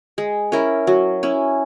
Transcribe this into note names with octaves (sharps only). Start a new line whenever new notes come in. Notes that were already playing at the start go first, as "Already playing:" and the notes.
G#3
C#4 E4 A#4
F#3
C#4 E4